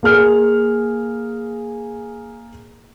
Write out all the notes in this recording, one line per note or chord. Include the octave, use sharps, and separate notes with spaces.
A#3 G#4 F6